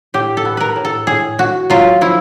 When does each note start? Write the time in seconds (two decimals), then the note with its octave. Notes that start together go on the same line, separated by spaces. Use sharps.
0.14 A2 G4
0.37 A4
0.45 B3
0.57 A#4 B4
0.76 A2
0.85 A4
1.07 A2 G#4
1.39 A2 F#4
1.70 F#3 F4
2.01 F3 E4